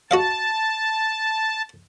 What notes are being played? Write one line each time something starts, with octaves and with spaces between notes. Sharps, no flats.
F#4 D#5 F5 A5